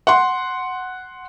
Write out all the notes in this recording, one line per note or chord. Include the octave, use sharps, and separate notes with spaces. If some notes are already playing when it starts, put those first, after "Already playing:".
F#5 C6